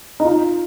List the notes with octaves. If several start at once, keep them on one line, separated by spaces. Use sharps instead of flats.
D#4
F4